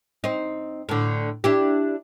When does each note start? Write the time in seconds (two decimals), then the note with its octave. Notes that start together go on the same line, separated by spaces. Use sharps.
0.24 C4 D#4
0.89 A2 D3
1.44 D4 E4 G4